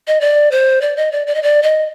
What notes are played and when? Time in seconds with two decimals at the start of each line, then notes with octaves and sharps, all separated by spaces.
0.07 D#5
0.21 D5
0.51 C5
0.81 D5
0.97 D#5
1.12 D5
1.27 D5
1.35 D#5
1.43 D5
1.63 D#5